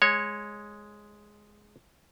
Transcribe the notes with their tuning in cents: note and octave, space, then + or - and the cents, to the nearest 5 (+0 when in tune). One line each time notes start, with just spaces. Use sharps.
G#3 +0 C#5 -10